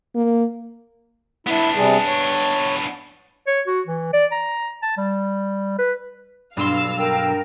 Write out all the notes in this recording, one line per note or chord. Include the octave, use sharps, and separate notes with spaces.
A#3
B3 D4 E4
C3 G3 G#4
C#5
C#5
F#4
E3
D5
A#5
A5
G3
B4
B1 G2 D4 F5 C6 E6
A#4 G5